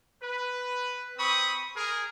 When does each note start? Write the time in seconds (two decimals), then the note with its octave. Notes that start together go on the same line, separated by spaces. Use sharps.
0.22 B4
1.18 C4 B5 C#6 D#6
1.76 G#4 A#4